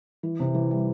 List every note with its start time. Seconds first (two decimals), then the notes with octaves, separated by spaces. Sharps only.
0.23 E3
0.40 C3
0.55 E3
0.71 G3